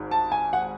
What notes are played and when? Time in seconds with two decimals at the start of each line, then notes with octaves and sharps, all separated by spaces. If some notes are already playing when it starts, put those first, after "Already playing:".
Already playing: G#1 G#2
0.11 A5
0.32 G#5
0.53 F#5